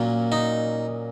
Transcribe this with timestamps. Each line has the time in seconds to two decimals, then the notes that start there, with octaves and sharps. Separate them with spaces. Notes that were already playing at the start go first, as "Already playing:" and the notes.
Already playing: A#2 F#3 A#3 C#4
0.32 D#4